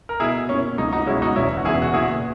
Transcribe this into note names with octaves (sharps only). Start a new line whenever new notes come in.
A#4
B2 E4 G#4
A#3 C#4 E4
C#2 D#4
D#4 F#4
B2 G#3 B3 C#4 E4
D#4 F#4
E1 C#4 E4
F#4
E2 C#3 E4 G#4
F#4
A#2 E4 G#4